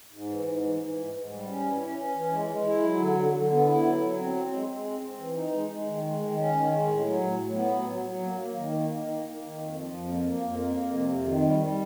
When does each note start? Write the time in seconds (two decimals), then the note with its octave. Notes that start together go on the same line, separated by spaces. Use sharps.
0.13 G#2
0.30 E3
0.46 G#2
0.63 E3
0.80 E3
0.97 G#2
1.14 G#2
1.31 G3
1.47 C#4
1.64 E3
1.81 C#4
1.98 C#4
2.15 E3
2.32 G#3
2.49 G#3
2.66 E4
2.83 F#3
3.00 D3
3.17 D3
3.34 D3
3.50 B3
3.67 E4
3.84 F#3
4.00 F#3
4.18 C4
4.35 C4
4.51 G#3
4.68 G#3
4.85 C4
5.02 C4
5.19 E3
5.36 D#4
5.52 G#3
5.70 G#3
5.86 D#3
6.03 G#3
6.20 D#3
6.37 C#4
6.54 D#3
6.71 G#3
6.88 A2
7.04 F#3
7.21 A2
7.39 A2
7.55 B3
7.72 F#3
7.89 F#3
8.06 F#3
8.23 A#3
8.40 A#3
8.56 D#3
8.73 A#3
8.90 D#3
9.07 A#3
9.24 A#3
9.41 D#3
9.58 F2
9.74 F3
9.91 F2
10.08 A#3
10.25 A#3
10.42 F2
10.59 A#3
10.76 F2
10.93 C3
11.10 F2
11.26 D#3
11.43 G3
11.60 G3